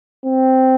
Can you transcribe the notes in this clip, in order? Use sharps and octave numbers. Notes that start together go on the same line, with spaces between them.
C4